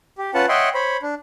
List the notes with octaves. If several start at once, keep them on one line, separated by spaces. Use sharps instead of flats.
G4
C#4 F4 B4 F#5 A5
C#5 D#5 E5 F#5 G5 C6
C5 C#5 B5
D4